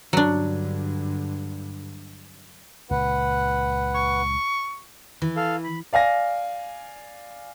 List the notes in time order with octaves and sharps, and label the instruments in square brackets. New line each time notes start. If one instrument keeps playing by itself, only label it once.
[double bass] G2 D3 [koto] F#3 D4
[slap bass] C#2 A#2 [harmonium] B4 F#5
[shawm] C#6
[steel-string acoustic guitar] E3
[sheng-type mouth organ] A4 F5
B5
[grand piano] D5 F5 G#5 A#6